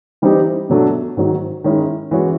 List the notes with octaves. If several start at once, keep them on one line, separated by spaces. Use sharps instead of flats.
E3 G3 C4 D#4 G4
B2 F#3 A3 D4
G#2 D#3 F#3
D#3 G#3 C#4 E4
E3 G#3 C#4 F#4